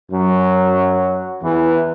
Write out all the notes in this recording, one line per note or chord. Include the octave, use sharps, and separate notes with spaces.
F#2 F#3
E2 E3